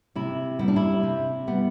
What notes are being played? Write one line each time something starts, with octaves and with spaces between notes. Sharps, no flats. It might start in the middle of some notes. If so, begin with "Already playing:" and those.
C3 E4
G3 B3 E4
D4
E4
C3
G3 B3